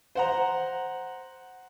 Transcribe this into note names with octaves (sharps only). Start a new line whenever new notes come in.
C5 F#5 A#5